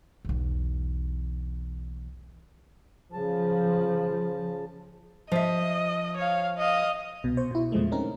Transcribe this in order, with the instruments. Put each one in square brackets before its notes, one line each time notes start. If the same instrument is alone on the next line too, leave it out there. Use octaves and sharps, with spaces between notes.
[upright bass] B1 E2
[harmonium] C#3 A5 [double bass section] F3
[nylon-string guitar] F3 E5 [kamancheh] D#5
[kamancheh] C#5 F5
D#5 F5
[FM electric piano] C2 B2
C5 C#6
B2 E4
E2 A#2 C#3 F3 G#3 A3
C4 C#4 D#4 A#4